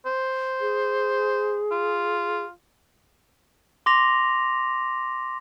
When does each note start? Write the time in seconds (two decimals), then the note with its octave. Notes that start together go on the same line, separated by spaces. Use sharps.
0.06 C5
0.61 G#4
1.72 F4
3.86 C6 D6 A#6 F7